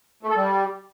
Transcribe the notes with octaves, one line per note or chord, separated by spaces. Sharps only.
A3
A4
G3